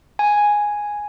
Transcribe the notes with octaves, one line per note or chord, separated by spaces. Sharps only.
G#5